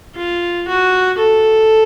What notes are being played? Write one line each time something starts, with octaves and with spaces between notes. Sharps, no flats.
F4
F#4
A4